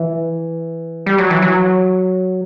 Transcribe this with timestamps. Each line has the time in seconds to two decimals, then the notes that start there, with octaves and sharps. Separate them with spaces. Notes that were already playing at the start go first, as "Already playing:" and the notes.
Already playing: E3
1.06 G3
1.18 F#3
1.30 E3
1.42 F#3